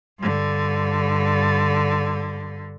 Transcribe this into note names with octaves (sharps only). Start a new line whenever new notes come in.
G2 D3